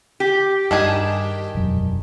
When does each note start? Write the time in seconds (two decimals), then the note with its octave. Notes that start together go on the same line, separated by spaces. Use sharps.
0.20 G4
0.71 G2 D#3 D4 G#4
1.55 E1 F#2